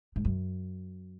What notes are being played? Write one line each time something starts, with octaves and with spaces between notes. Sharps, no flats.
G#2
F#2